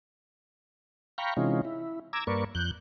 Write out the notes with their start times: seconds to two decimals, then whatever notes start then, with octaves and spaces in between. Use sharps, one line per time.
1.18 F5 G5 A#5 B5 C#6
1.37 C3 E3 G#3 C#4 D#4 F4
1.65 E4
2.13 A#5 D6 E6 G#6
2.27 G2 A#3 A#4 B4 D5 C#6
2.55 F2 F#6 G6